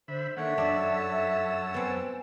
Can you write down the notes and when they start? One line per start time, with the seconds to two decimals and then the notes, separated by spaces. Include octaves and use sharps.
0.08 D3 C5 E5 B5
0.37 D#3 A#3 D4 A4 C#5 E5 F#5
0.58 F#2 D4 D#5 A5 E6
1.74 B3 C4 G5 G#5